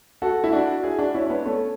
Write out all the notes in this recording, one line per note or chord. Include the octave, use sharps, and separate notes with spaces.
F#4 A4
E4
D4 F#4
E4 G#4
D4 F#4
C#4 E4
C#4
B3 D4
A3 C#4